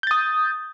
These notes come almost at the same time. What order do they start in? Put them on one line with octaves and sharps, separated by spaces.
G6 A6 D#6